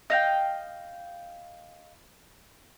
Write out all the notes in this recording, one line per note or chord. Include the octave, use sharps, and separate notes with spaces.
D#5 F5 G5